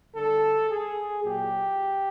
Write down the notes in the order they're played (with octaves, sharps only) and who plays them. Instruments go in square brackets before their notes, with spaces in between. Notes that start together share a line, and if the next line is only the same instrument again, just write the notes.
[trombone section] D3 G3 A4
G#4
A#2 F#3 G4